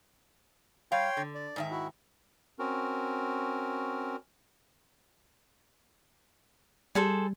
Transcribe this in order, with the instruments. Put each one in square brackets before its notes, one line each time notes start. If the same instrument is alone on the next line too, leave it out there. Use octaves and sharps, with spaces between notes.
[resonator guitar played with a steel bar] G3 F5 [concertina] C#5 G5 C6
[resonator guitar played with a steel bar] D3
[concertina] D5
[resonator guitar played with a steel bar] G#2 D#3 E5
[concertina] E4 F#4
C4 C#4 F#4 A#4
[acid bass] G3 [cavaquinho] G#4 A4 C5